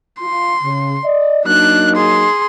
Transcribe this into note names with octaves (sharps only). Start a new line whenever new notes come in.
F4 C6
C#3
D5 D#5
F#3 A#3 D4 D#4 F#6
G#4 C6